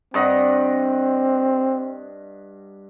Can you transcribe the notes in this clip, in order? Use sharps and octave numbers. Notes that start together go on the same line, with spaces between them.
G2 C4 D#5 F#5